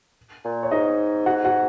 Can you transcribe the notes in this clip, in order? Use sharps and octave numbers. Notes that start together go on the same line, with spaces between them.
A#2
C#5
G#2 D#4 D#5
F#4 F#5
F#4 F#5